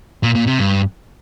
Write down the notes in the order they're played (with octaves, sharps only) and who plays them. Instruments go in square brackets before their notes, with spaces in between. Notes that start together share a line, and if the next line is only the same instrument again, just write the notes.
[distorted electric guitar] A#2
A#2
C3
G2